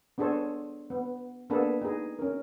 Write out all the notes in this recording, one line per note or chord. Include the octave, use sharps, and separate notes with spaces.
B3 D4 G#4 A4 C5 C#5
B3
A#3 B3 D4 G#4 A4 B4
D#4 G#4
C#4 A#4